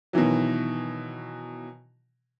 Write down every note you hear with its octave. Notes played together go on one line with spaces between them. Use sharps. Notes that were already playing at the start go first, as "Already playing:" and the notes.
B2 D#3 E3 F#3